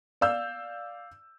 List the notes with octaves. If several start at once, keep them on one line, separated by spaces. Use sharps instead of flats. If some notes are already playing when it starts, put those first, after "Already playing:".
D5 F5 E6 G6